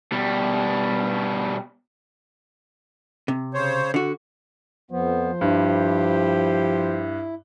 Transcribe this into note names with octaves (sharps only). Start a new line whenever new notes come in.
B2 G3
C3
C#3 C5 C#5
D3 F#4
F2 F3 B3 C5
G2 E4 G4